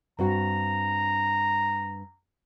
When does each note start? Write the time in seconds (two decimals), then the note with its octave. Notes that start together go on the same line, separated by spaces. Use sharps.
0.19 G2 C4 F#4 A#5